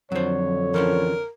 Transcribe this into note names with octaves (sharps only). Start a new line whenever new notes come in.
F2 D3 F#3 C5 C#5
E3 F3 C#4 A#4